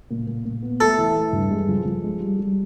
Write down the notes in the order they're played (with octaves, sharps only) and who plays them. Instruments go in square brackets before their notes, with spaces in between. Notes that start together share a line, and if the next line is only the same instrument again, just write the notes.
[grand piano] A#2
A#2
A#2
B3
[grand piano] A3 [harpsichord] A4
[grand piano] E3
A3
G2
G#3
F3
F3
G#3
G3
G3